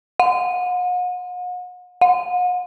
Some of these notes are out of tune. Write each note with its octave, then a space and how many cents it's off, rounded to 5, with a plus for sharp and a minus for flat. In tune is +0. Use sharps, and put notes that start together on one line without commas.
F#5 -40
F#5 -40